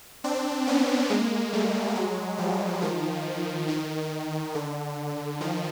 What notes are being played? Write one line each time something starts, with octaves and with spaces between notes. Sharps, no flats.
C4 D4
B3 C#4
G#3 A#3
G3 A3
F#3 G#3
F3 G3
D#3 F3
D#3
D3
D#3 F3